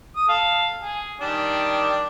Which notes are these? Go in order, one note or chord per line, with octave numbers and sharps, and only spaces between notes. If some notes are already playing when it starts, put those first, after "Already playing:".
D#6
A4 F5
G#4
D#3 G3 D4